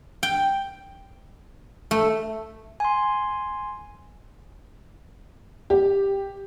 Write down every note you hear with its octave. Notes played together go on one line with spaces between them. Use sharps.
G5
A3
G#5 C6
G4